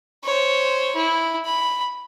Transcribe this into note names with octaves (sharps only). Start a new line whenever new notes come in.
C5 C#5
E4
B5